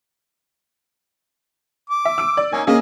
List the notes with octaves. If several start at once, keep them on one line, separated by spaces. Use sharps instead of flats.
D6
E5
E6 D7
D5
A#3 C#4 D#4 G#5
A#3 C#4 G#4 D#5